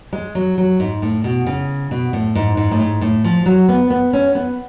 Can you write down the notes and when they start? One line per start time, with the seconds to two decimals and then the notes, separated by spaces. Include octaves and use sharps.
0.13 G#3
0.35 F#3
0.58 F#3
0.80 G#2
1.02 A2
1.24 B2
1.47 C#3
1.91 B2
2.13 A2
2.35 G#2
2.57 G#2
2.71 A2
2.80 G#2
3.01 A2
3.24 F3
3.46 F#3
3.69 B3
3.90 B3
4.13 C#4
4.35 B3